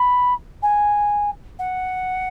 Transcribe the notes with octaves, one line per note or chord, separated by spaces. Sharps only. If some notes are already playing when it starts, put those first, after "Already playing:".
Already playing: B5
G#5
F#5